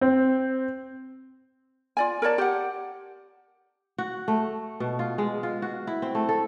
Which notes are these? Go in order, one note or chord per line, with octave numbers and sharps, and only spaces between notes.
C4
F4 D5 G#5
A#4 C#5 D5 A5
G4 F#5
F#4
A3
B2
F4
G#3
F4
F#4
E4
C4
A3
A4